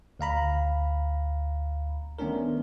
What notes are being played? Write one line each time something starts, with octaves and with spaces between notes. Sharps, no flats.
D2 F5 A#5 B5
D#3 A3 B3 C#4 D4 A#4